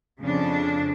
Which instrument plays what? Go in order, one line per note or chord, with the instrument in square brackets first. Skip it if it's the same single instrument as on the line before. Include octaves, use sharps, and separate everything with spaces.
[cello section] F2 C#3 D4